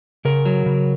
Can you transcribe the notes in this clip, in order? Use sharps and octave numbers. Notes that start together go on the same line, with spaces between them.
C#3 A#4
F#3
C#3